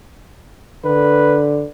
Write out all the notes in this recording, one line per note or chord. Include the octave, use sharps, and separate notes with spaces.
D3 B4